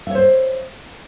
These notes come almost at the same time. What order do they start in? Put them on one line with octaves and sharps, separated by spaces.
E5 C#5 C5